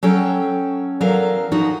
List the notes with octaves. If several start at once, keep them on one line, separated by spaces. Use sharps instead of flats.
F#3 C#4 A4 G5
E2 F#3 A4 A#4 F5
E3 F3 D#4 F#4